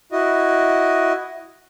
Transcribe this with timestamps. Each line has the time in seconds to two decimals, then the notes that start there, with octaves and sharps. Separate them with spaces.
0.12 E4 F#4 D#5